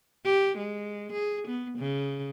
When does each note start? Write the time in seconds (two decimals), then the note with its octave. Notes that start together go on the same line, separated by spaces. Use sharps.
0.24 G4
0.58 G#3
1.13 G#4
1.48 B3
1.78 C#3